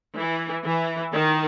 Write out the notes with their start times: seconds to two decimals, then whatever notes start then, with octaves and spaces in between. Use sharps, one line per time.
0.16 E3
0.65 E3
1.13 D#3